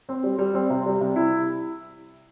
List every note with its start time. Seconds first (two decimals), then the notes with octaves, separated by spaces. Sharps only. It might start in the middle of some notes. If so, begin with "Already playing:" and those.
0.09 C4
0.24 G3
0.38 G3
0.54 C4
0.70 C3
0.86 G3
1.01 C3
1.16 E4